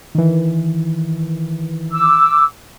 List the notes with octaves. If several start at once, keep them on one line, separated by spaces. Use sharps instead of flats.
D#3 E3
D6 E6